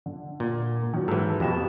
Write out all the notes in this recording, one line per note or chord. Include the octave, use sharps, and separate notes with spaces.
D3
A#2
D#3 F#3
G#2 E3 A4
F2 B2 G4 E7